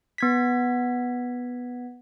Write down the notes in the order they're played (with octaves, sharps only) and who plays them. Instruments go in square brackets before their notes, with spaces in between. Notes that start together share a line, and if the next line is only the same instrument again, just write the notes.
[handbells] B3 G#6 B6